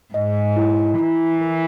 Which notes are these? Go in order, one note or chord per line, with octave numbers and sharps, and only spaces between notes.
G#2 D#5
E4
E3 E4
A#4